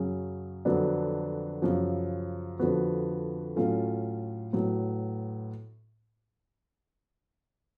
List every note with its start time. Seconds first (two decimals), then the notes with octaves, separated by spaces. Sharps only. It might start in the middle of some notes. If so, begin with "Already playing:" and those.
Already playing: F#2 C#3 F#3 C#4 G#4
0.65 F2 D3 F#3 B3 D4
1.62 F#2 C#3 F3
2.59 F2 D3 F3 B3 F#4
3.56 A2 F#3 C#4 F4 A4
4.53 A2 F#3 B3